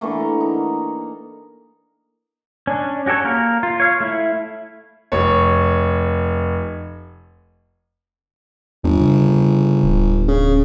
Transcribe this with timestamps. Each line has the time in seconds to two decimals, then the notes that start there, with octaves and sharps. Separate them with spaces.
0.01 D3 E3 A3 A#3
0.20 A#5
0.41 D#4
2.67 C#4 D4
3.06 C#4 F#4 G4 A4 C#5
3.25 A#3 A#4
3.63 F4
3.80 C#5 F5
4.00 A3 E4
5.12 F1 C#5
8.84 G1 E2
9.00 C#3
9.84 D1
10.28 C#3